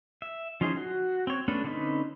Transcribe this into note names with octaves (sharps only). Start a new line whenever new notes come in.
E5
F3 C#4 D#4 G#4 C5
F#4
C4 C#5
A3 B3 C#4 D4 A4
D3 C4 C#4 D#4 B4